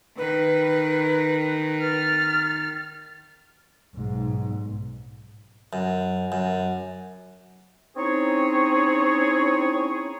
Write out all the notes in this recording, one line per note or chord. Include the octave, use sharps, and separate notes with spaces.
D#3 B4
F6 A6
B1 G#2
F#2
F#2
C4 C#4 D#4 E4 G#4 C#5